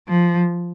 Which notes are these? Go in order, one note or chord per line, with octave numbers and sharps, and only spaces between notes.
F3